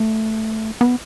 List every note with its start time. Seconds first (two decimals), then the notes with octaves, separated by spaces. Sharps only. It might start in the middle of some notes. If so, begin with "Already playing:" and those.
Already playing: A3
0.81 B3